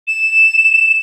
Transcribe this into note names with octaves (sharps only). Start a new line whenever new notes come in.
E7